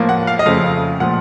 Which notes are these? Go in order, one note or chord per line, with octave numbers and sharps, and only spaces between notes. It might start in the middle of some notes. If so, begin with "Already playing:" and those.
Already playing: A2 F3 A#3
F#5
F5
D#5
F2 C#3 F3 A3 F5
A#2 F3 A3 F#5